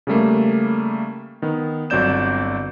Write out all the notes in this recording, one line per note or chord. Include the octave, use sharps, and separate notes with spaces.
C#3 G3 A3 A#3
D#3 B3
G1 F#3 C4 D5 G6 E7